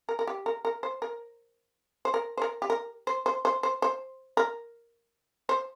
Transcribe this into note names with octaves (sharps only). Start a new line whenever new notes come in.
A#4
A#4
G4
A#4
A#4
C5
A#4
C5
A#4
C5
A#4
G4
A#4
C5
C5
C5
C5
C5
A#4
C5